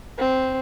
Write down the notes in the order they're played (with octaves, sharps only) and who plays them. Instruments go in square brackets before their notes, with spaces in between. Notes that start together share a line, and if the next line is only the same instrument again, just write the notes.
[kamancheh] C4